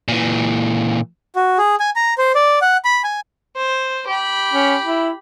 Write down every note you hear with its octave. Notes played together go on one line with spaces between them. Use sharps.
A#2 E3
F#4
G#4
G#5
A#5
C5
D5
F#5
B5
G#5
C5
G4 B5
C#4
E4